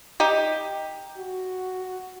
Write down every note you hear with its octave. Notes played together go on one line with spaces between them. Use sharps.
D#4 G4
F#4